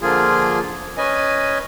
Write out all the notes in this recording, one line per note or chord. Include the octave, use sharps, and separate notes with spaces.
D3 F3 A#3 F4 G#4
C#4 B4 D#5 G#5